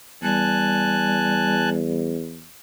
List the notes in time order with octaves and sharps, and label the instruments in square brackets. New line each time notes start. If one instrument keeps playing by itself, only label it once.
[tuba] E2 [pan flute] G3 [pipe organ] G#5 A5 F#6